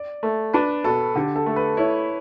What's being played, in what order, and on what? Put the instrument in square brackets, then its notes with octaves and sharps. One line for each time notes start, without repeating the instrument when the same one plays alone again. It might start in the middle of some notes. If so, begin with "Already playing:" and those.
Already playing: [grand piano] D5
[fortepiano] A3
[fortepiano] D4 [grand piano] B4
[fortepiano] B2 [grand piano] A4
[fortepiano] D3 [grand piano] G4
[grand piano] A4
[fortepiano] A3
[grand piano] B4
[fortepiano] E4 [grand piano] C#5